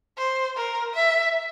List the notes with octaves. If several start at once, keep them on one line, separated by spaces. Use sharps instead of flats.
C5
A#4
E5